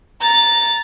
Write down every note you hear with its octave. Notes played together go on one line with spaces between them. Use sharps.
A#5 A6